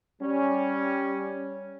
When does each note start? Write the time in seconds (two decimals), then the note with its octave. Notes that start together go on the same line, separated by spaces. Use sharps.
0.20 G3 C#4